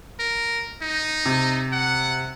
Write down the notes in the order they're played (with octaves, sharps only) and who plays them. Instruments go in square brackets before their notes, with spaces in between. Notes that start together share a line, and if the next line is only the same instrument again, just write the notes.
[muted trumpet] A#4
D#4
[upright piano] C3
[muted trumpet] F#5